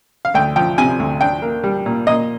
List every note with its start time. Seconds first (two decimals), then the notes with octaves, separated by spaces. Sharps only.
0.25 F5
0.34 D2 G5
0.56 F3 G5
0.78 C3 G#5
1.00 D2
1.21 D4 G5
1.42 A#3
1.64 G3
1.86 A#2
2.07 A#2 D#5